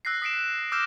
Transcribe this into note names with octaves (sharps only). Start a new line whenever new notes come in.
E6 F#6 A#6 C7
D#6 B6 C7 D7 E7
D6 E6 F6 G6 A#6 E7